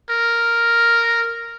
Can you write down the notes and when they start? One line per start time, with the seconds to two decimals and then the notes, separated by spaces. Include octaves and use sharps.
0.10 A#4